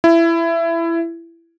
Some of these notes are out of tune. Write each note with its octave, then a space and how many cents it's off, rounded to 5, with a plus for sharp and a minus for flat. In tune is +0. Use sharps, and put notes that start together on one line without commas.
E4 +20